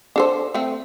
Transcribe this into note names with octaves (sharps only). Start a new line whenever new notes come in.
D4 A4 C5
A3 C4